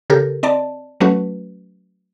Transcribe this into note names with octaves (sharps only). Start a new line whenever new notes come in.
C#3 G4 A4 A#4
C4 D5 D#5 A5
F#3 A3 C#4 F#4 B4